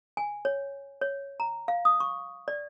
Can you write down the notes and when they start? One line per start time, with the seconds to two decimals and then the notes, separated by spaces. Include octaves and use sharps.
0.17 G#5
0.45 C#5
1.01 C#5
1.40 A#5
1.68 F5
1.85 D#6
2.00 C#6
2.48 D5